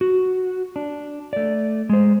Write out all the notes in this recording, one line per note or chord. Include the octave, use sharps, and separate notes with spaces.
F#4
D4
A3 D5
G#3 C5